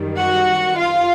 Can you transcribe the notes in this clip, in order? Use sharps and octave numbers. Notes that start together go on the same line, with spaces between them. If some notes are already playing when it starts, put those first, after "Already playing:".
Already playing: F#2 D#3 G3
F#4 F#5
F4 F5